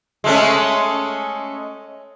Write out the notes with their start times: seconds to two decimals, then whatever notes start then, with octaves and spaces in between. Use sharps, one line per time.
0.24 G#3 A3 C#4